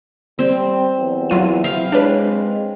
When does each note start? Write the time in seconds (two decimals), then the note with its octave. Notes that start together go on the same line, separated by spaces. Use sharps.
0.39 G3 C4
0.98 E2 F#3
1.30 F#3 E4 F4 D#7
1.64 C3 F5 G5
1.92 G#3 D4 B4 C#5
2.22 C4